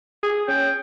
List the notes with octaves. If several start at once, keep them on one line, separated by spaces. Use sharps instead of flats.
G#4
C#4 G5